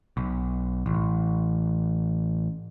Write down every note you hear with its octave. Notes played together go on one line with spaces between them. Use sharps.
B1
A1